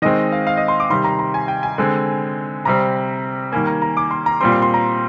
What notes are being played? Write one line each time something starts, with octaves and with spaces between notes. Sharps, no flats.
D#3 G#3 C4 D#5
F5
F5
D#5
C6
D6
C3 D#3 G3 C6
A#5
A#5
G#5
G5
G#5
D3 G#3 C4
C3 G3 C4 A#5
D#3 G3 A#3 G#5
A#5
A#5
D6
C6
A#5
A#2 G3 C4 C6
C6
C6
A#5